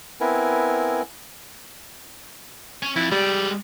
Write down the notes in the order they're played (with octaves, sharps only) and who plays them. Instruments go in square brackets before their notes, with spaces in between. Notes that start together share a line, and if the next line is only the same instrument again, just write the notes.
[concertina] B3 C4 E4 A#4 B4 G#5
[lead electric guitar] C#4
[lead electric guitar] F2 [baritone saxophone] E4
[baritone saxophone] G3 [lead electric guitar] G#3 D5